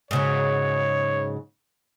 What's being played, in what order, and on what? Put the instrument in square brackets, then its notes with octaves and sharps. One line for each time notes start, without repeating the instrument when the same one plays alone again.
[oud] G#2 C#3 F#3 [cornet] C#5